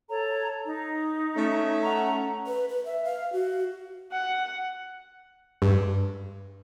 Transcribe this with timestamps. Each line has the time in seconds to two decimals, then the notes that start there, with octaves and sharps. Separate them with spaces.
0.10 A4 C#5 A#5
0.65 D#4
1.36 A3 C#4
1.83 F#5 A#5
2.47 B4
2.69 B4
2.85 E5
3.04 F5
3.33 F#4
4.12 F#5
5.62 G2